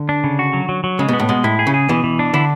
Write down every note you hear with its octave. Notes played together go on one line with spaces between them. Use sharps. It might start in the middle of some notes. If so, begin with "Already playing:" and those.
Already playing: D3
D4
C#3
F#4
F#3
F#3
F#3
C#3 G#3
B2 B3
A2
B2 G#3
A2 E4
G#4
C#3
G#4
B2 E3
E3
D4
D3 E4